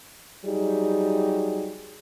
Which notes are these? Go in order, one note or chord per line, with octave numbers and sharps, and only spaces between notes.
F#3 G3 D#4 G4 G#4